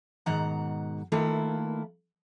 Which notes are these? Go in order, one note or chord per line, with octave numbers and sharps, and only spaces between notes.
G#2 B2 D#3 F#5 A#5
D#3 A3 A#3 E4 F4 B4